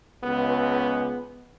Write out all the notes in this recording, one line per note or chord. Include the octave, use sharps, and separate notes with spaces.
C#2 B3